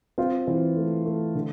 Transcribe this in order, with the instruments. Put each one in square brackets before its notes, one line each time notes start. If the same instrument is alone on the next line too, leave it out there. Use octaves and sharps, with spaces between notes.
[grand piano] C4 [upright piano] F4
[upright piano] E3 [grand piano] C4
[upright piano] A3
A3
D3